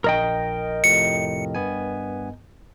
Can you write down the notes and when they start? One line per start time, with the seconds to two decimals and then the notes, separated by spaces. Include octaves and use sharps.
0.04 A#1 A#4 D#5 G5
0.84 F2 A2 C3 C#7
1.55 G2 B3 G#5